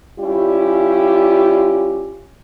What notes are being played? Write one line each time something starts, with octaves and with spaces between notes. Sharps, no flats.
G3 C#4 E4 F4 G4